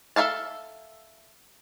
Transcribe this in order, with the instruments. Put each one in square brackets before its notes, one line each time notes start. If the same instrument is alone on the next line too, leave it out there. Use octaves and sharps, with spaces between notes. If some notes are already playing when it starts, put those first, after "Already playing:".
[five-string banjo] A4 A#4 E5 F5 A5